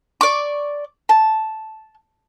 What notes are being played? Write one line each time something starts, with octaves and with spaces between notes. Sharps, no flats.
D5 C#6 D6
A5